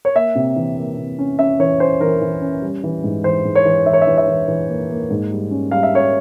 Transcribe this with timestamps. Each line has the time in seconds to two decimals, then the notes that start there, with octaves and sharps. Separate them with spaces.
0.05 C#5
0.15 A#3 E5
0.35 C3
0.56 E3
0.77 A#3
0.98 C3
1.19 C#4
1.39 C#4 E5
1.60 E3 C#5
1.80 C#4 C5
2.01 E3 A#4
2.21 E3
2.42 C#4
2.62 G3
2.84 E3
3.04 G#2
3.24 E3 C5
3.45 G#2
3.55 C#5
3.65 E3
3.86 E3 E5
3.93 C#5
4.02 E5
4.07 E3
4.18 E5
4.27 E3
4.48 E3
4.69 A#3
4.90 A#3
5.11 G#2
5.31 G3
5.51 C#4
5.71 G3 F5
5.83 E5
5.93 C#4 C#5